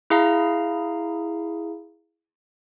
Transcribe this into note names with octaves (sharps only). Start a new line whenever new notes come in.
E4 G#4 F5 A#5